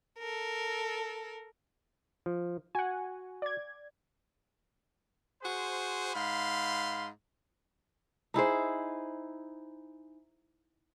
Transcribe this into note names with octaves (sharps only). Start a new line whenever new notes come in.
A4 A#4
F3
F#4 F#5 G#5
D5 G#6
F#4 G#4 C5
G#2 F5 B5 C6
D#4 E4 G#4 C5